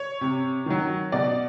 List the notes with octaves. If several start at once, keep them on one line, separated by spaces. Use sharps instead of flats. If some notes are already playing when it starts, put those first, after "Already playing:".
Already playing: C#5
C3
D#3 F#3
B2 D5